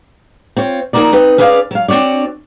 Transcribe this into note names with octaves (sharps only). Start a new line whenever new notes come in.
C4 F4 C#5
F3 A#3 D#4 F#4 A#4 D5
C4 D#4 B4
C#4 G#4 B4 D5 E5 F5
F#3 F5
C4 D4 F#4 C#5 D5